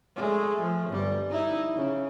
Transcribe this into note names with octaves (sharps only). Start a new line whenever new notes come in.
G#3 A3
F3
G1 G3
D#4 E4
C#3